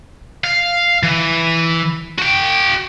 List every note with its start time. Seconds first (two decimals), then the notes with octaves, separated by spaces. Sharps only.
0.44 F5
1.03 E3
2.18 F#4 G5